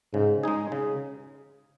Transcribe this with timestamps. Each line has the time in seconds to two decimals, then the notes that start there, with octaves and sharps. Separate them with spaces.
0.13 G#2 C#3
0.43 G#3 D#4 G#4
0.72 C#3